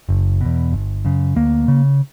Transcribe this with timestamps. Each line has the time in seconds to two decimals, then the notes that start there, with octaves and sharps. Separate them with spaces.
0.09 F#1
0.41 E2 B2
0.72 G1
1.05 F#2 C#3
1.36 D2 A#3
1.68 C#3